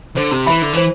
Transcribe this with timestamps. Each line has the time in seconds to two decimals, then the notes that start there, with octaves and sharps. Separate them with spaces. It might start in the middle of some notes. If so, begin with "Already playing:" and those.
0.17 D3 C5
0.32 C3
0.46 E3 E5 B5
0.62 D3
0.73 E3 C5